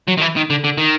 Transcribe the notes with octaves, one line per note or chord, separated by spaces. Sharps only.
F#3
D#3
E3
D#3
D3
D3
D#3